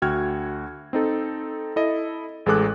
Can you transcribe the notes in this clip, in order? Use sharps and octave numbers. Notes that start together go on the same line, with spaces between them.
D2 F#4 G5 F6 G#6
C4 D#4 A4
E4 A4 D#5
A1 G#3 G#4 A4 D6 F#6